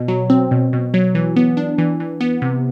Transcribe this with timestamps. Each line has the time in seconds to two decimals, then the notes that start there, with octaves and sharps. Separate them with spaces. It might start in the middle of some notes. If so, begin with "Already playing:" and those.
Already playing: B2
0.08 F#3
0.30 C4
0.51 B2
0.73 B2
0.94 F#3
1.15 E3
1.36 B3
1.57 D4
1.78 E3
2.00 E3
2.21 B3
2.42 C3